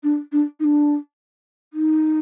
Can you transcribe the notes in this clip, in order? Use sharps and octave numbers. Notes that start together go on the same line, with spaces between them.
D4
D4
D#4
D4
D#4